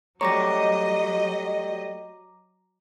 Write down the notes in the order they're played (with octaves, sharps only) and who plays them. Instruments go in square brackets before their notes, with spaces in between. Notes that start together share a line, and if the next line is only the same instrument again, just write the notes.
[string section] F#3 D#5 [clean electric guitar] G3 A3 C#5 [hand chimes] A#5 D6 A#6